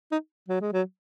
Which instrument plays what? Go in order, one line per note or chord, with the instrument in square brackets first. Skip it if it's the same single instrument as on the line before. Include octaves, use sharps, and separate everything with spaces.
[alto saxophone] D#4
F#3
G#3
F#3